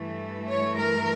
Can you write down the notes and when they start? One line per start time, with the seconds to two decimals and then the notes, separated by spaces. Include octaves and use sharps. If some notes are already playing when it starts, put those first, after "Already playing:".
Already playing: G2 E3 A3
0.49 C#5
0.78 A#4